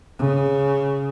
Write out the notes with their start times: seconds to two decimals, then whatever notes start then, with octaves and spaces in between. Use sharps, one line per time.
0.19 C#3